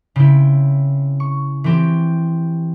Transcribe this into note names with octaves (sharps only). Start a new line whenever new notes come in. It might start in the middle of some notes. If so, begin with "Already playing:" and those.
C#3 C4 E4
C#6
E3 C4 G4